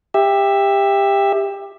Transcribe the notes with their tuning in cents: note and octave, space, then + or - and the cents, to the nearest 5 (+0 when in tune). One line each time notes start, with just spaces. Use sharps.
G4 +20 E5 +0